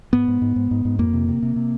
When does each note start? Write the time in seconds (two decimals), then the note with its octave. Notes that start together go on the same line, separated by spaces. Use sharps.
0.13 G#2 B3
0.28 G#2
0.42 G#2
0.56 G#2
0.71 G#2
0.85 G#2
0.99 F2 A#3
1.13 C3
1.29 C3
1.42 C3
1.56 C3